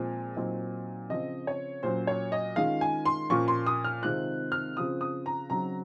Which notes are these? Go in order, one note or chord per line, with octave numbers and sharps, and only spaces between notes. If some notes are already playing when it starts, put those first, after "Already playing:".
Already playing: A#2 F3 G#3 C4
A#2 F#3 C4 D#4
C#3 F3 C4 D#5
C#5
A#2 F#3 C#4 C5
C#5
D#5
D#3 G#3 C#4 F4 F5
G#5
C6
A#2 F3 A#3 C#4 F4 C#6
C6
D#6
F6
C3 D#3 G#3 C4 F4 F#6
F6
C#3 F3 C4 F4 D#6
D#6
A#5
C#3 F#3 C4 D#4 A#5